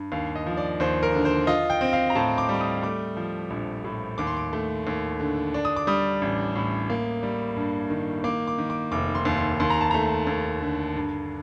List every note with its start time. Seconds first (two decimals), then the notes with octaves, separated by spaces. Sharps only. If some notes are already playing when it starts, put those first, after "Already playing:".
Already playing: G2
0.12 D#2 F5
0.36 D#5
0.46 F3
0.57 D5
0.80 D#2 C5
1.03 A#4
1.14 D3
1.25 C5
1.47 F4 D#5
1.70 G5
1.81 C4
1.93 F5
2.10 A#5
2.15 A2 A5
2.38 D6
2.49 G3
2.55 D6
2.61 D#6
2.82 A3 D6
3.17 F3
3.50 A#1
3.84 A2
4.18 D#2 D6
4.27 C6
4.37 D6
4.53 A3
4.87 D#2
5.20 D3
5.54 D4
5.65 D#6
5.76 D6
5.87 G3 D#6
6.21 A1
6.56 A2
6.90 A#3
7.23 G3
7.56 G2
7.90 D#3
8.24 A#3 D6
8.47 D6
8.58 D#3
8.70 D6
8.92 F1 D6
9.15 C6
9.25 D#2
9.37 C6
9.60 D#2 C6
9.70 A#5
9.81 A5
9.91 A3 A#5
10.27 D#2
10.61 D3
10.95 G2